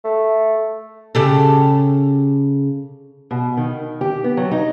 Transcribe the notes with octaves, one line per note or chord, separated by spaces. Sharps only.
A3
C#3 G4 A4
B2
D#3
G4
B3
F#3
D#4